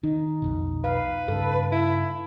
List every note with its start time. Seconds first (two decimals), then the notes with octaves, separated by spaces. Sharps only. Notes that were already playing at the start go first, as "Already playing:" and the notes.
0.03 D#3 D#4
0.42 B1 F2 B2
0.84 B4 F5
1.28 G2 C#3 A4
1.72 E4